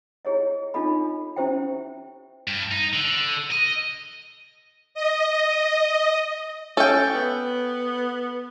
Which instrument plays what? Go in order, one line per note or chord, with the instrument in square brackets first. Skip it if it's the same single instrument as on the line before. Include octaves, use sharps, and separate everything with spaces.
[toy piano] E4 G4 G#4 C#5 D#5
D4 D#4 F4 A4 D#5 B5
C#4 E4 G4 C5 E5 G5
[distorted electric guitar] G2
D#4
D3
D#5
[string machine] D#5
[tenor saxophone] C#4 [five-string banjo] A4 G5
[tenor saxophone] B3